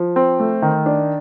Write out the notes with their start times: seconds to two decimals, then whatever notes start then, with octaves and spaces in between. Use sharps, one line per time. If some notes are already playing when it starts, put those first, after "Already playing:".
Already playing: F3
0.16 C4
0.40 A3
0.62 D#3
0.86 D4